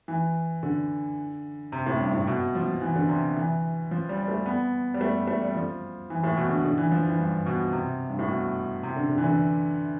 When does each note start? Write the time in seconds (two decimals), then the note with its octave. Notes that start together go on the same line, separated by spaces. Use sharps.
0.08 E3
0.63 D3
1.72 C3
1.86 A2
2.00 G2
2.13 A2
2.27 B2
2.55 F3
2.68 F3
2.81 E3
2.96 D3
3.09 C3
3.37 E3
3.91 F3
4.09 G3
4.28 A3
4.46 B3
4.94 G3
5.01 A3
5.27 A3
5.42 G3
5.55 F3
6.10 E3
6.23 A2
6.37 B2
6.50 D3
6.65 D3
6.78 E3
6.91 F3
7.06 E3
7.19 G2
7.46 B2
7.73 C3
8.09 G2
8.19 A2
8.28 B2
8.83 C3
8.96 D3
9.10 D3
9.18 E3
9.24 D3